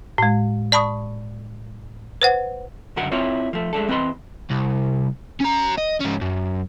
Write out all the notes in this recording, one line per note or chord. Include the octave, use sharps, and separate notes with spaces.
A2 G#3
D5 A5 B5 C#6 D#6
B4 C5 F#5
C#2 F#2 D3 F#4 A#4 F#5
C4 E4 F4 A#4 C#5
F3 A3
G#3 A3 D4 A4
E2 C4 B4 D#5 B5 C6
C2
C#4 A#5
D#5
G#2 C#4
F#2